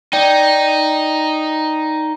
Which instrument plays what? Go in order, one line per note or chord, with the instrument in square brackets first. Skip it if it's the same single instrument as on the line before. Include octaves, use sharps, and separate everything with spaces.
[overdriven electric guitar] D#4 [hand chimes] D5 G5